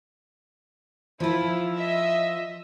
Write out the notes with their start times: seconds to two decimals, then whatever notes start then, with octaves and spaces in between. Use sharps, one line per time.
1.20 F3 E4 F4
1.75 D#5 E5